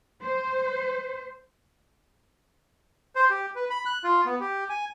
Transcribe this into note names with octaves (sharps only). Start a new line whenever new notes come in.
C5
C5
G4
B4
B5
F#6
F4
B3
G4
G#5